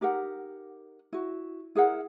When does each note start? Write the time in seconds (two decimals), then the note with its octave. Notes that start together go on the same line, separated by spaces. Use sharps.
0.01 D#4 G4 A#4 F#5
1.13 E4 F#4
1.75 E4 G#4 A#4 F#5